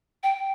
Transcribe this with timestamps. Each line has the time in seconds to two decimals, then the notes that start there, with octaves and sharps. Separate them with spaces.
0.23 G5